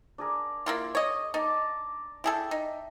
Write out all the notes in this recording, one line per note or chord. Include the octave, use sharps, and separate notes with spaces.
D4 G#4 A#4
A#3 E4 F4
C#5 D#5
D#4 A5 A#5 D6
E4 G#4 A4 E5 G5
D#4